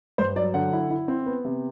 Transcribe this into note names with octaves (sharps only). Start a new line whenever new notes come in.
G2 C5
F#3 D5
D3 F#5
E4
E4
C4
B3
C3